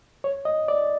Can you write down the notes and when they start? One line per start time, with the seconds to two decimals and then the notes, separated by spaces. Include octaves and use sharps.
0.24 C#5
0.45 D#5
0.68 D5